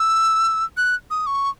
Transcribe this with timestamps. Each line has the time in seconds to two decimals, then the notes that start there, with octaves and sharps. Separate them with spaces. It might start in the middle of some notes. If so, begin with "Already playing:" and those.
Already playing: E6
0.77 F#6
1.11 D#6
1.27 C#6